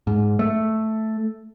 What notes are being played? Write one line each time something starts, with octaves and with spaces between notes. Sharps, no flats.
G#2
A3